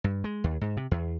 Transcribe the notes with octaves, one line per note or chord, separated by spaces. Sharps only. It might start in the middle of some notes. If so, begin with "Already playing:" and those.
G2
G#3
D#2
G#2
C3
E2